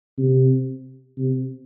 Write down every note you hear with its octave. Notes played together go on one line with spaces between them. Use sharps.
C3
C3